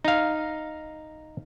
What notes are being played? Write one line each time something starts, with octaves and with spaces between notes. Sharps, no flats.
D#4 F5